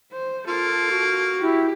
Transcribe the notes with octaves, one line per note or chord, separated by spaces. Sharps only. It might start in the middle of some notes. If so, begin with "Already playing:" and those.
C5
A#3 F4 A4
F#4
E4 G4